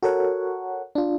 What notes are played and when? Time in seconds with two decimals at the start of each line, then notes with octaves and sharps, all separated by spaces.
0.03 F#4 A4 A#4 C#5 F#5
0.95 D4 F4